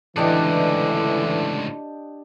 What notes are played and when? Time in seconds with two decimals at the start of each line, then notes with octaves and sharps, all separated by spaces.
0.16 C#2 A2 D3 E3 D4 G4 D#5